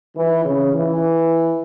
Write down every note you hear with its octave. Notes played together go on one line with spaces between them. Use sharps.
E3
C#3
E3